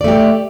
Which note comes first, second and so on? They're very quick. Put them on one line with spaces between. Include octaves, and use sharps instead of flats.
D5 A3 G4